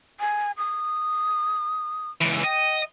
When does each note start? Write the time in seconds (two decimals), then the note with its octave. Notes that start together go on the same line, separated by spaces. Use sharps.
0.20 G#5
0.58 D#6
2.21 C#2 E3
2.44 D#5 G5